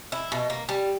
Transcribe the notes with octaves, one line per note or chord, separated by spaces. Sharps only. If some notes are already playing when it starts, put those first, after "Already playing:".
E4
B2
A#3
G3